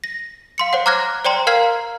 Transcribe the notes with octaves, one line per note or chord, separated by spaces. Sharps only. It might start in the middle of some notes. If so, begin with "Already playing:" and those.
A#6
F5 C6 C#7
C5 C#5 F#5
A#5 D6 F6 F#6 G#6 A#6
C5 D5 G5 A#5 C6
A#4 F5 A#5 F6 G#6 C7